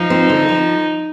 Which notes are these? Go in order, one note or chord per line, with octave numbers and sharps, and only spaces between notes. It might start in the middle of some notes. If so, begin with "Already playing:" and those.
Already playing: F3 D#4
C4
D3
F3